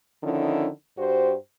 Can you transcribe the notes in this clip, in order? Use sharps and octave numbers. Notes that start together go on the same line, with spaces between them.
D3 D#3 F3 C#4 D#4 E4
G2 F#4 G4 C5